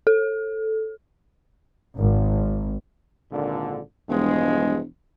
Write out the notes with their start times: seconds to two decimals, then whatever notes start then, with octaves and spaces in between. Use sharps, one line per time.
0.07 A4
1.96 G#1
3.31 G#1 A#2 D3
4.09 E1 G2 F3 G#3